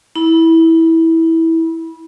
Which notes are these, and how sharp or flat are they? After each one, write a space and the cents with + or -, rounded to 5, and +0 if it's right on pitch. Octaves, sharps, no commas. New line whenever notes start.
E4 -15 B5 -20